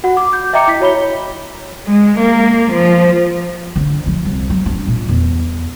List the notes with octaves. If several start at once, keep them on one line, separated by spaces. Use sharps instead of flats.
F#4 F#5
D6
G6
D#5 E5 G5 A#5 D6 C#7
E4 B6
F#4 C#5 B5 G7
G#3
A#3
F3
D3
F3
C2
F#3
D4
A#2
E2